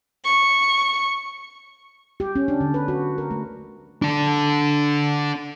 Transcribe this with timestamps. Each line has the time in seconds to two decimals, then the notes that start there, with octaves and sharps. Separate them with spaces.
0.25 C#6
2.20 G4
2.36 C#4
2.48 D4
2.61 D3
2.74 B4
2.88 F#4
3.18 A#4
3.31 A3
4.02 D4 A4